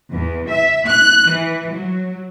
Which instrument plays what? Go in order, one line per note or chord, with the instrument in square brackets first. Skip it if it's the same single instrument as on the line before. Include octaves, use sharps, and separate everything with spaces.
[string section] E2
E5
F#6
E3
F#3